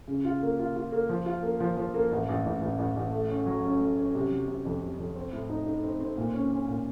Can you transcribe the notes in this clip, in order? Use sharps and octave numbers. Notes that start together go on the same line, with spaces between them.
C#3
F4
A#3
F4
F4
A#3
F3
F4
A#3
F3
F3
A#3
A1
A1
A1
A1
A1
A1
A3
C#4
F#3
C#4
A3
C#4
C3
F#3
C3
F2
C3
F2
C4
A2
D#4
D#4
C4
C4
A#2
C#4
C#4
A#2